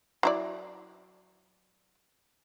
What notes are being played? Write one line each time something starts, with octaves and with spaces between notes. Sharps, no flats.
F#3 E4 D5